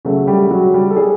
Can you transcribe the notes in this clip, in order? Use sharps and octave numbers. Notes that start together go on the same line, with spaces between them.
C#3 F#3 A3
G3 G4
F#3 F#4
G3 G4
A4
G#3 G#4